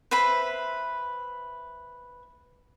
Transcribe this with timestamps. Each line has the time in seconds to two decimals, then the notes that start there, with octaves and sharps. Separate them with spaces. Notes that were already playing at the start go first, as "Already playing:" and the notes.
0.11 B4 C5 E5 B5